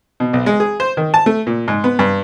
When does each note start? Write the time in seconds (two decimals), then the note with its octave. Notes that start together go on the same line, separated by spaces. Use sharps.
0.20 B2
0.33 B1
0.46 G#3
0.60 G#4
0.80 C5
0.97 D#3
1.14 A5
1.26 A3
1.47 A#2
1.68 G#2
1.84 B3
1.99 G2